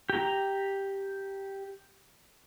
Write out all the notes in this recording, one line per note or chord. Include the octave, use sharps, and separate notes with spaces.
G4 A#5